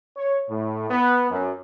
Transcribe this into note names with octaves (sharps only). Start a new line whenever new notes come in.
C#5
A2
B3
F#2